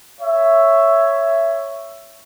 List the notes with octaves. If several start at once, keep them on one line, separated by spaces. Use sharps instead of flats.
C#5 E5